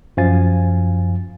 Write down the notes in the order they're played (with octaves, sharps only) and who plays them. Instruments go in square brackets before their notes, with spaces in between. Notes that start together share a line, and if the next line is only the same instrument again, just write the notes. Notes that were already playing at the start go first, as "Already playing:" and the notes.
[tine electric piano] F#2 F3 F5 G#5 A6